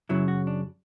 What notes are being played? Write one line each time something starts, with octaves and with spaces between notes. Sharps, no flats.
F#2 C#3 F#3 E4
F#4
D4